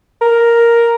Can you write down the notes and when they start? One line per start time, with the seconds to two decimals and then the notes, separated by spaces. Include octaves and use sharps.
0.21 A#4